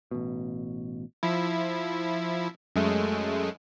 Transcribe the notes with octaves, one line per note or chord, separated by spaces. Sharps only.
A1 B2
F3 E4
F#2 G#3 A3